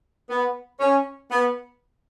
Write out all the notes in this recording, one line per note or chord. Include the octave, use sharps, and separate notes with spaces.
B3
C#4
B3